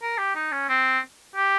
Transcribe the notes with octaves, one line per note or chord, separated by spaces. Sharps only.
A#4
G4
D#4
C#4
C4
G4